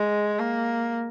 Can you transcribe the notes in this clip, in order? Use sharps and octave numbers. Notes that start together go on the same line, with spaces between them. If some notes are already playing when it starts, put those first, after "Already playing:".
Already playing: G#3
A#3